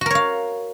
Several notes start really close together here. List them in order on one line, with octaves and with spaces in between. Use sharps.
F#4 A#4 C#5 F5